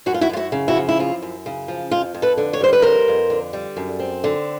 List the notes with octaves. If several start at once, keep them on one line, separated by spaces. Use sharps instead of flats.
F#2 F#4
F4
E4 F#4
F#2 F4
E4 F#4
C#3
E4 F#4
F3
E4
F#2 F4
F#2
C#3
F3
F2 F4
F2
A4 B4
D3
C#5
G3 C5
B4
F2 A#4 C5
F2
D3
G3
F#2
C4
D3